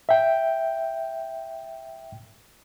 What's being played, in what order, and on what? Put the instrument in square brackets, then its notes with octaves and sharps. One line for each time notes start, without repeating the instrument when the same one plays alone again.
[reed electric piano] E5 G5